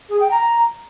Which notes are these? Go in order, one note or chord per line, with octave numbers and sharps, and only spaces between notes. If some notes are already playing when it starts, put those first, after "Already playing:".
G#4
G5
A#5